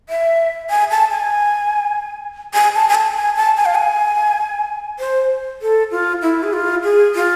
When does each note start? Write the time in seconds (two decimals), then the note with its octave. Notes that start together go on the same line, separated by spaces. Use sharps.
0.09 E5
0.70 G#5
0.91 A5
1.11 G#5
2.54 G#5
2.75 A5
2.88 G#5
2.95 A5
3.16 G#5
3.36 A5
3.57 G#5
3.66 F5
3.75 G#5
4.99 C5
5.62 A4
5.91 F4
6.22 E4
6.43 G#4
6.53 F4
6.83 G#4
7.15 F4